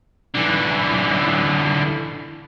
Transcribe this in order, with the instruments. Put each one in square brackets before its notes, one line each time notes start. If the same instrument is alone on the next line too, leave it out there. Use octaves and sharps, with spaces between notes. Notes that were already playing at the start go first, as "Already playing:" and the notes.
[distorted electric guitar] D3 E3